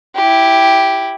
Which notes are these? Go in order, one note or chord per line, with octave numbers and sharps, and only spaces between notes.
E4 G4